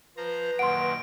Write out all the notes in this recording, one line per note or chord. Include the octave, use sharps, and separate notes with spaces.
F3 B4 C5 A#5
F#2 A#2 D#3 F#5 C6 D7